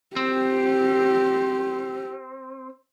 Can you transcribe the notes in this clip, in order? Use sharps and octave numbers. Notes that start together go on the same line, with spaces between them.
C4 G4